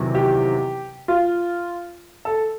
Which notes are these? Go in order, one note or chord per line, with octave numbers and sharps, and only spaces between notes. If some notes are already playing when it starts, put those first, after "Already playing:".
Already playing: E2 C3 D#3 F#3
G4
F4
A4